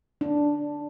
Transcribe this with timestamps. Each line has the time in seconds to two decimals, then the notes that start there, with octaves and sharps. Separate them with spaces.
0.21 D4